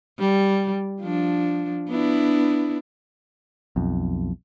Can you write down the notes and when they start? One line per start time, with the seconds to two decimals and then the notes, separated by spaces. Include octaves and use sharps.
0.20 G3
1.02 F3 D4
1.89 B3 D4 E4
3.76 B1 F2